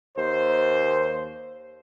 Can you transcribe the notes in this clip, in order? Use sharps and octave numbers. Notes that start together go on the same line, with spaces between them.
D#2 C5